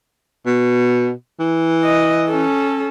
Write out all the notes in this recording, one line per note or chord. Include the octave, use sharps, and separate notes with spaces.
B2
E3
D#5
C#4 A4